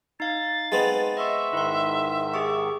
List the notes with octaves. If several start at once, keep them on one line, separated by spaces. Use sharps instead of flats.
D#4 F5 A6
G#3 B3 C4
D#5 E5 C6 C#6
G#2 D#3 E4 C6
G4 G#4 C#6